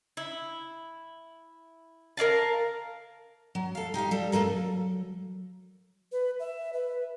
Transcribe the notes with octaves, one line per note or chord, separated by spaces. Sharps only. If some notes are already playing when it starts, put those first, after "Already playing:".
E4
A#4 D5 F5 A5
F#3
A4 F5
D#4 G4 D#5 F5
G3 A4
A3 A#3 A4 A#4
F#3
B4
E5
B4